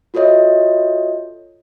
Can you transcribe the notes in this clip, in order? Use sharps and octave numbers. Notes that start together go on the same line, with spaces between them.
F4 F#4 A4 C#5 D#5 E5